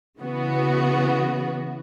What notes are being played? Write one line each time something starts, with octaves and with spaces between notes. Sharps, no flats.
C#3 E3 B3 F#4